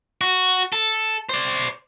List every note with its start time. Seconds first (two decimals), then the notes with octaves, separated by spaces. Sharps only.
0.21 F#4
0.73 A4
1.29 C5 D5